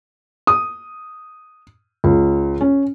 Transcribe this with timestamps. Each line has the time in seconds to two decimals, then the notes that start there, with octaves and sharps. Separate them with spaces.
0.47 D#6
2.04 C#2
2.61 C#4